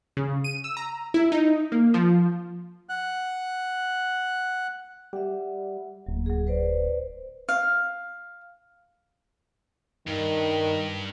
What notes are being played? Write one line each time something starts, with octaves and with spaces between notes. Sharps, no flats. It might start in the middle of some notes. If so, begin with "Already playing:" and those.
C#3
D#7
E6
A#5
E4
D#4
A#3
F3
F#5 F#6
G3 E5 F#5
D1 F#3 A#3
F#3 G#4
B4 C5 D5
F5
G2 D#3